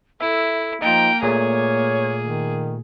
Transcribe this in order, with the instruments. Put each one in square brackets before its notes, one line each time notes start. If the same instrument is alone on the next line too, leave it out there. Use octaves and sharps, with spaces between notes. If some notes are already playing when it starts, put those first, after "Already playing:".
[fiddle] E4 [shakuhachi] A4 [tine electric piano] E5
[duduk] F3 [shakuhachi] A#3 [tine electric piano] D#4 F4 [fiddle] G5 A#5
[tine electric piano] A#2 A3 [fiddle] G#4 [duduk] C#5
[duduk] D#3